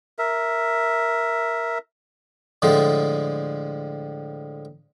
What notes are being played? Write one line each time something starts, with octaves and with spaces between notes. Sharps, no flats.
A#4 E5
A2 D3 F3 G#3